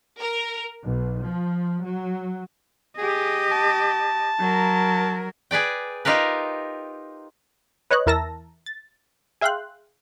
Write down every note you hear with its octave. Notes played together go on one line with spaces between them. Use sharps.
A#4
B1
F3
F#3
G4 G#4 D#5
A5
F#3 A#4
G#4 B4 D5 G5
D#4 F4 G4 A#4 B4
B4 C#5 D#5 F#6
E2 E4 A#4 A5 E6 A#6
A6
G#4 E5 F5 G5 C6 F#6